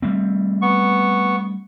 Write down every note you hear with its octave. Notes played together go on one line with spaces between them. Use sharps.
G3 A3 C4
B3 C#6